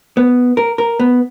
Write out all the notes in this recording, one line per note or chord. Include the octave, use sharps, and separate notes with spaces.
B3
A#4
A#4
B3